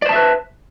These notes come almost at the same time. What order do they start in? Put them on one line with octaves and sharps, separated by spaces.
D5 C5 A5 E5 B4